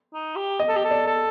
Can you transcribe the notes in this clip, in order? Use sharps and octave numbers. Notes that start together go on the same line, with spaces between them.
D#4
G4
D#5
A4
G4
A4
D5
A4